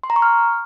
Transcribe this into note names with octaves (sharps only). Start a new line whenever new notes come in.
C6
A#5
C#6
F6